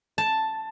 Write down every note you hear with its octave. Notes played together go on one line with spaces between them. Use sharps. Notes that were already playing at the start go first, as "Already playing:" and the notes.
A5